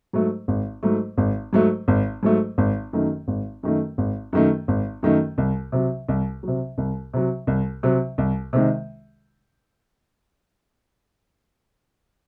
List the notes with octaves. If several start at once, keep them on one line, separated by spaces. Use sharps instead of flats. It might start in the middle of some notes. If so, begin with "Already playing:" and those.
G#2 F#3 A3
G#1
G#2 F#3 A3
G#1
G#2 F#3 A3
G#1
G#2 F#3 A3
G#1
F#2 D#3 A3
G#1
F#2 D#3 A3
G#1
F#2 D#3 A3
G#1
F#2 D#3 A3
C2
C3 F#3
C2
C3 F#3
C2
C3 F#3
C2
C3 F#3
C2
C3 D#3 G#3